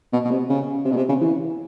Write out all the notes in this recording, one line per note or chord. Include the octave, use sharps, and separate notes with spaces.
B2
B2
C3
C#3
C3
B2
C3
C#3
E3